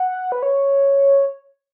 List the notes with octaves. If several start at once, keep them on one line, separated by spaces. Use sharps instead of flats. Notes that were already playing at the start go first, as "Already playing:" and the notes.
Already playing: F#5
B4
C#5